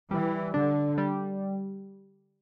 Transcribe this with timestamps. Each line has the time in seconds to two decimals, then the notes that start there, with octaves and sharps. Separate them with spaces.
0.11 E3 G3
0.54 D3 D4
0.98 G3